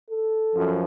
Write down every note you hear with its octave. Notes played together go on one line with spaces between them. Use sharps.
A4
F#2 F3